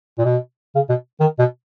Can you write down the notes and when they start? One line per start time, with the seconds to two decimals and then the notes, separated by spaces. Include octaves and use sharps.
0.18 A#2
0.25 B2
0.75 C#3
0.89 B2
1.20 D#3
1.39 B2